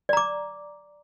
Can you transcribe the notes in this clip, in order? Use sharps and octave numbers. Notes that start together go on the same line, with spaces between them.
D5 A#5 D6